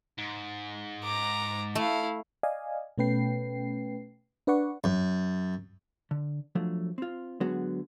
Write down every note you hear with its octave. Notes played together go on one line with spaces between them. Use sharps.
G#2
A#5 D6
A3 E4 F5
D5 D#5 F5 G#5
B2 A3 C#4 B4 G5 C7
D4 B4 D5 F#5 C#6
F#2
D3
F3 F#3 A3 D4
C4 F4
D3 F#3 G#3 B3 F#4 G#4